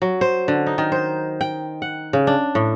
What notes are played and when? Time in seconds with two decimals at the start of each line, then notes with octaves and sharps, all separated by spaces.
0.02 F#3
0.21 C5
0.48 D3
0.67 D#4
0.78 D#3
0.92 C5
1.41 G5
1.82 F#5
2.13 C#3
2.27 D4
2.55 A2